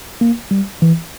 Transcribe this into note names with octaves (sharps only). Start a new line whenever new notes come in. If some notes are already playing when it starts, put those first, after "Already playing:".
A#3
G3
E3